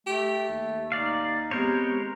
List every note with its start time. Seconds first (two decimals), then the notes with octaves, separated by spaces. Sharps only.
0.06 A3 G4
0.49 D#2
0.92 D#4 D5 F5
1.51 G#3 B3 C4 G4 A#4 C5 C#5